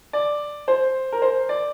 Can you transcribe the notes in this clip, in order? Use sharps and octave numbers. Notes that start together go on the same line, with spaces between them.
D5
C5
A#4
C5
D5